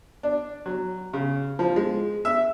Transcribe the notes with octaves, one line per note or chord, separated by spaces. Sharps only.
D4
F#3
C#3
F3
G#3
E5